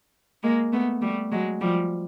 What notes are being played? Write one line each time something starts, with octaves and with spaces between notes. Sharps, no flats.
G#3 A#3
A3 B3
G3 A3
F#3 G#3
F3 G3